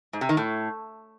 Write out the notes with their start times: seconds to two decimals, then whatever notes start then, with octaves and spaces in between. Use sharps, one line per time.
0.13 G#2
0.21 C3
0.29 D#3
0.37 A2